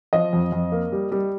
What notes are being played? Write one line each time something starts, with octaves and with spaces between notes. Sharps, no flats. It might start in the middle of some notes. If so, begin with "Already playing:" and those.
F3 D#5
F2
F2
A#3
G3
G3